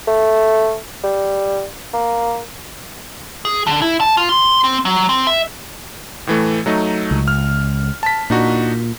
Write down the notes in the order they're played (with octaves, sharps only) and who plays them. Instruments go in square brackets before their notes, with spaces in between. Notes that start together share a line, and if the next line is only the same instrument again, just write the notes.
[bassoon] A3
G3
A#3
[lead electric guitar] G#4
D3
E4
A5
F4
C6
C4
F#3
C4
E5
[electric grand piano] A2 E3 A3
F#3 A3 D#4
[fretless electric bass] C#2
[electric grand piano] F6
A5 B6
[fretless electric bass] A#2 [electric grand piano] D4 D#4 F#4